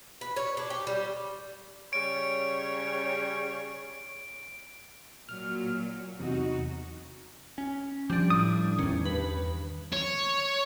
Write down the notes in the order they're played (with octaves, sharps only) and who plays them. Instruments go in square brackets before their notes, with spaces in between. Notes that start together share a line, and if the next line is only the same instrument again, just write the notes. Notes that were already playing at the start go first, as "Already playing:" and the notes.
[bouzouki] B4
C#5
D4
G4
G3
[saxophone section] C#3 G3 C#5 [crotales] D7
[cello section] A#2 F#3 [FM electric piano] F6
[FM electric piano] E2 C3 [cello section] D#4 F#4
[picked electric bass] C#4
[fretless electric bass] F3 [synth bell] G3 D4
[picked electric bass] A2 [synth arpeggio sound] D#6
[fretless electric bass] E2 D#3 [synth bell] C#4
[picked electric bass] G2 [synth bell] B4
[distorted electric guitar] C#5